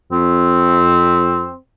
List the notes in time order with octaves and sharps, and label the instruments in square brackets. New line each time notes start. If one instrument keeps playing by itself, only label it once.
[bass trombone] F2 [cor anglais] C4